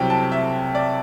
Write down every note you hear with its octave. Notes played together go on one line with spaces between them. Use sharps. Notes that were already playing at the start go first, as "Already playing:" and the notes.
Already playing: C2 C3 F#3 G5
A5
E5
D5